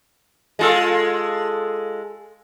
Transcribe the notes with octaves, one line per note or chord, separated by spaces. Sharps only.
G#3 F4 A4